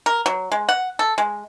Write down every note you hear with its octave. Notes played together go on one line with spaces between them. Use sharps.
A#4
F#3
G#3
F#5
A4
G#3